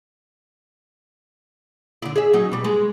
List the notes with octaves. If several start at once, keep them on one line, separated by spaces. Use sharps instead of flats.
D3 E4
G#4 E5
F#3 C#4 D#4
B2 G3
G#3